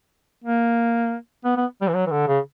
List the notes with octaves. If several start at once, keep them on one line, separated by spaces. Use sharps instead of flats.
A#3
B3
B3
G3
E3
F#3
E3
D3
C#3